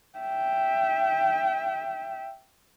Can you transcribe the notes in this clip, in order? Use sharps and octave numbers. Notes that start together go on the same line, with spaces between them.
E5 G5